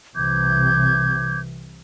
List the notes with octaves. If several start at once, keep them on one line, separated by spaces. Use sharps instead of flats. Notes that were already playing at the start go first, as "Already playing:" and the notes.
C2 C3 E3 D6 G6 G#6